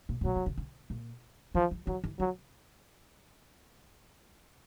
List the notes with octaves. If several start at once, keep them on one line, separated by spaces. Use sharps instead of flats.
A#2
A#2
B2 F#3
C3
C#3
C#3
A#2
E3 F3
F3
E3 F#3
E3
F3 F#3